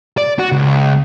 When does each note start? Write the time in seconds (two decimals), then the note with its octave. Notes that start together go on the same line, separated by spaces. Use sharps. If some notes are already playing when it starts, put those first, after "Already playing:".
0.18 D5
0.39 F#4
0.52 C#2